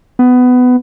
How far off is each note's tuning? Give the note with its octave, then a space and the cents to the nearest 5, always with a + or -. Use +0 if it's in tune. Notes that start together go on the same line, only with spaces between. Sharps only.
B3 +15